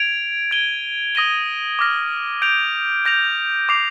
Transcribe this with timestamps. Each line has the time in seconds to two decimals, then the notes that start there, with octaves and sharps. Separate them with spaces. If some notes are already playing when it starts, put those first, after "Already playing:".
Already playing: G#6 D7 F7
0.51 G#6 D#7 G7
1.15 D#6 A#6 D#7 G7
1.79 D6 F6 A#6
2.42 G6 D7 F7
3.05 G6 A#6 F7
3.69 D6 G6 C7 F7